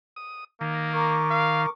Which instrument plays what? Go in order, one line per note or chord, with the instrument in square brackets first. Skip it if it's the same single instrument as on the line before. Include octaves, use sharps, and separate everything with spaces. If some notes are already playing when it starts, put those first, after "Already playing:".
[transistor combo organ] D#6
[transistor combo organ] D#3 [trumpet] A#3
[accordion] A#4 C#6 D6
[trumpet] F5